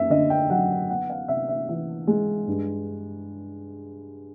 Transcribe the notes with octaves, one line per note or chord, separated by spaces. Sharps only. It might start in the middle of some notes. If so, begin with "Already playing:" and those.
Already playing: F#2 A#3 E5
D3 D#5
G5
F#3 F#5
B3 F#5
F5
C3 E5
E5
E3 E5
G#3
G2